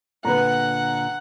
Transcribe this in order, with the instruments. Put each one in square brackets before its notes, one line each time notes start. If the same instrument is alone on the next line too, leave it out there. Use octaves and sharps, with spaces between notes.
[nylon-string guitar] A#2 D3 [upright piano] B4 A#5 [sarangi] F#5